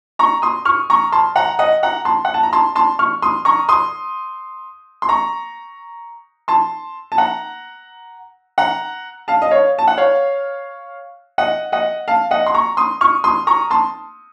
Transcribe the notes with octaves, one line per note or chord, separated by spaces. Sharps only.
A#5 C#6
C6 D#6
C#6 F6
A#5 C#6
A5 C6
F#5 A#5
D#5 F#5
F#5 A#5
A5 C6
F#5
A5
A#5
A5 C6
A5 C6
C#6 F6
C6 D#6
A#5 C#6
C6 D#6
C6
A#5 C#6
A5 C6
A5
F#5 A#5
F#5 A#5
F5 A5
D#5
C#5 F5
A5
F#5
C#5 F5
D#5 F#5
D#5 F#5
F5 A5
D#5 F#5
C6
A#5 C#6
C6 D#6
C#6 F6
C6 D#6
A#5 C#6
A5 C6